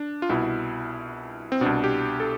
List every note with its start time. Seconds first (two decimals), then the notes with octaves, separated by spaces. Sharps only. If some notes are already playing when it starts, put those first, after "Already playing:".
Already playing: D4
0.22 F4
0.29 C2 B2 E4
1.52 C4
1.61 C2 B2 D4
1.84 G4
2.20 A4